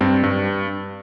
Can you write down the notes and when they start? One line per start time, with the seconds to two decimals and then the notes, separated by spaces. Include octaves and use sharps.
0.01 G2 C4
0.23 G2